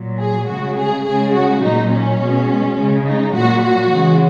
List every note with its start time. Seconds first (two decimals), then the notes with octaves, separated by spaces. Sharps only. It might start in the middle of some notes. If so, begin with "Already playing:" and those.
Already playing: A#2 F#3
0.19 G#4
0.48 C#3 G#3 F#4
0.76 G#4
1.05 C#3 G#3 G#4
1.33 F#4
1.62 A#2 F#3 D#4
1.90 C#4
2.20 B2 G#3
2.77 C#3 G#3
3.05 D#4
3.34 A#2 F#3 F#4
3.62 F#4
3.91 C#3 E3 G#3